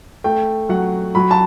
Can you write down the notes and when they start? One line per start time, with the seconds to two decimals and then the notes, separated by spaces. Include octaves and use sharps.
0.24 A3 G5
0.69 F#3 F#5
1.15 F#3 B5
1.31 A5